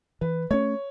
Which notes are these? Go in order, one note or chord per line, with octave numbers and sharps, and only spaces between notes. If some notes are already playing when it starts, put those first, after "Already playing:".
E3 B4
A3 C#4 C#5